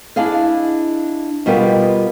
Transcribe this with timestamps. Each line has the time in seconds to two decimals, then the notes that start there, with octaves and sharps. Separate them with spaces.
0.16 D4 E4 G#4 D#5 F5
1.46 B2 G3 B3 F4 A#4